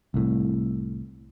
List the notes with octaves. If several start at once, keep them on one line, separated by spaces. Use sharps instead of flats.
C2 A2